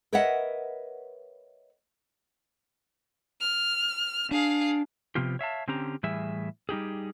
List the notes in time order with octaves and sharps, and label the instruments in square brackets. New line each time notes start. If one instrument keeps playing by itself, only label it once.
[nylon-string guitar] A#4 B4 C#5 D#5 E5 F#5
[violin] F6
[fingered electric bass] D4 [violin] G#4 F5
[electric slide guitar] C3 F3 B3 F4 G4
C#5 E5 F5 A5
D3 C4 C#4 G4 A#5
A2 E3 G3 G#4 E5
G3 D#4 G4 G#4